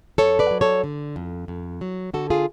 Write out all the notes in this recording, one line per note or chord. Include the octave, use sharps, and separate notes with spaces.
F2 A4 C#5
B4 D5
F#3
A4 C#5
D3
F2
F2
F#3
D3 F#4 A4
F4 G#4